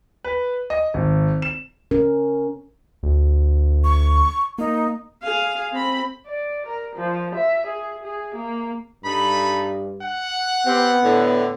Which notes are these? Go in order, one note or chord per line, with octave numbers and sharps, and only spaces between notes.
B4
D#5
G#1
E7
C#4 A#4
D2
C#6
A#3 D#4
G#4 F5
C4 B5
D5
A#4
F3
E5
G#4
G#4
A#3
G2 D#4 A4 B5
F#5
B3 C4 G4
A2 D3